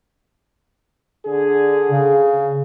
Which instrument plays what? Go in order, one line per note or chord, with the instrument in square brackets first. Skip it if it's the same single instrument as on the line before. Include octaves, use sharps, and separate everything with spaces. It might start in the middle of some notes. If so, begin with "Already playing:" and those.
[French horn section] D3 G#4
[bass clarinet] C#3